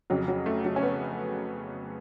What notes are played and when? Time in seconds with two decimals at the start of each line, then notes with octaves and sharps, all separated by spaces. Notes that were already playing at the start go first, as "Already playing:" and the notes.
0.10 F2 C#3 F#3
0.28 F#3
0.46 A3
0.65 F#3
0.76 C#4
0.82 B3